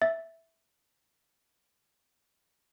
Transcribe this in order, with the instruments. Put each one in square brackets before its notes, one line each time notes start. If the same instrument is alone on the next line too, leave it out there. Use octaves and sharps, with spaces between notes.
[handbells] E5 A6